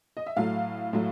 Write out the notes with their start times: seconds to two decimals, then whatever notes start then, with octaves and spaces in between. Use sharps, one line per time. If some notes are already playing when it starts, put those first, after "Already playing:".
0.17 D#5
0.26 E5
0.37 A2 F#3 A3 F5
0.93 A2 F#3 A3